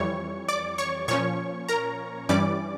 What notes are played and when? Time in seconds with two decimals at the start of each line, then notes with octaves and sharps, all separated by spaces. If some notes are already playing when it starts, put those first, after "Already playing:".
Already playing: F2 E3 G3 C#5 C#6
0.48 D5 D6
0.78 C#5 C#6
1.08 A#2 F3 C#4 C#5 C#6
1.69 A#4 A#5
2.29 G2 E3 G3 C#4 D5 D6